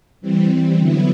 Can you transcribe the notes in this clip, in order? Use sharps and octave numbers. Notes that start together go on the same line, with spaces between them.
E3 G3 C4
D3 F#3 B3 E4